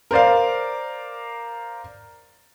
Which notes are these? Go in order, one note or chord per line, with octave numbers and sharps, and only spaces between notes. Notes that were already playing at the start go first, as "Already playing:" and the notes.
A#4 C5 D5 F5